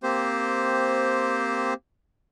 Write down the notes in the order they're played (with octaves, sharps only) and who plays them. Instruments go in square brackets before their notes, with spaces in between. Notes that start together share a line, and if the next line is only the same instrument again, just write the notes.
[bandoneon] A#3 C4 G4 C5